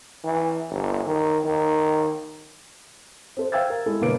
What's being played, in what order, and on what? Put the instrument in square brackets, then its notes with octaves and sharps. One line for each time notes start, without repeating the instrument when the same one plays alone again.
[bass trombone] E3
G1
D#3
D#3
[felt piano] C4 A4 C5
C5 F5 G5 E6 G#6 A6
A#4
G#3 E4 A4
G1 B2 A#3 B4 D7